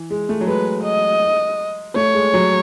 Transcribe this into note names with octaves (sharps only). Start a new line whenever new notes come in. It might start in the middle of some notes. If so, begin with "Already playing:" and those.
Already playing: E3
G#3
A3
F#3
G#3 B4
D#5
A3 C#5
G#3
F#3